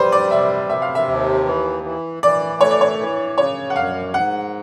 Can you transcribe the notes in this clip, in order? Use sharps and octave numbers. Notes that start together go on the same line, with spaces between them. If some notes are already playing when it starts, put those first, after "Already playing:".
Already playing: G3 B4 C5
D5
C3 E5
C3 E5
F5
E5
D#2
E3
E3
E3 D5
A3 C#5
D5
C#5
E3
C#3 C#5
F#5
F#2 F5
G#2 F#5